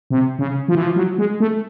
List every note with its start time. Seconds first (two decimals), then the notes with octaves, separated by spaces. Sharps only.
0.10 C3
0.39 C#3
0.68 F3
0.75 E3
0.83 F3
0.96 F#3
1.18 G#3
1.40 A3